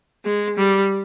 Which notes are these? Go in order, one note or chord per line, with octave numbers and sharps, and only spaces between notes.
G#3
G3